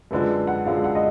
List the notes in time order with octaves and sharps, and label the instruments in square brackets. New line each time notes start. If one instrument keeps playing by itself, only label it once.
[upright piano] F#2 D3 G#3 D4 F4 [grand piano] B4
[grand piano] F#5
[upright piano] F#2 D3 G#3 D4 F4 [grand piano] F5
[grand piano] F#5
D#5